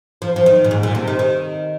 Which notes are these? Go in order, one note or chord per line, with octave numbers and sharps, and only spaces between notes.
F3
F3
D#3
A#2
G#2
A#2
C3
D#3
D#3